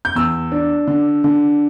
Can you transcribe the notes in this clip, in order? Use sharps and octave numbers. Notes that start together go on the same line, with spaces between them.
G6
E2 E6
D4
D3
D3